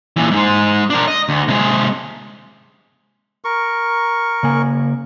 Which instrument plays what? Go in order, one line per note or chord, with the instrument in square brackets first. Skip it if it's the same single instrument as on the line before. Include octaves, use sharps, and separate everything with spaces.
[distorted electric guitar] A#2 E3
G#2 G#3
D4 A#4
D#5
D2
C3 G#3
[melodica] A#4 C#6
[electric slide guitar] C#3 A#3 G#5